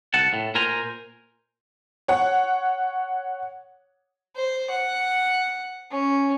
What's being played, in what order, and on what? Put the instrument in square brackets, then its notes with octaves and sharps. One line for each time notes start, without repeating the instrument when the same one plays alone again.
[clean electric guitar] C2 F#5 A5
A2
A#2 A#4 C5 G#5 A#5
[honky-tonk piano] C#5 F#5
[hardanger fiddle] C5
F#5
C#4